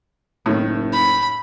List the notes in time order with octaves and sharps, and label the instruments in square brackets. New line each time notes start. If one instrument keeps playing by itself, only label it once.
[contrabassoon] F#1 [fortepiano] A2 D#3
[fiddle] B5